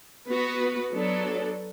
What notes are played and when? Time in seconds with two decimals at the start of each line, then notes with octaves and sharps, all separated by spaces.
0.28 B3 F#4 B4
0.91 F#3 B3 D4 A4